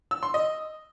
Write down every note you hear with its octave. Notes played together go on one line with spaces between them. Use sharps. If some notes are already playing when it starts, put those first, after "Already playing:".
E6
C6
D#5